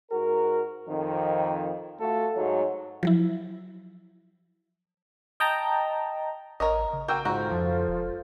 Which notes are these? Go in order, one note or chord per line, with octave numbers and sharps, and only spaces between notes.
G#2 F#4 A#4
F2 D#3
A3 F4 F#4 A4
G#2 F#3
F3 F#3 E4
D#5 G5 A5 A#5
A1 A#4 C#5 D#5 A#5
C#3
A#3 F#4 G5 E6 G6
G#2 F4 F#4 A4 C5 A#5
F2 F3
F1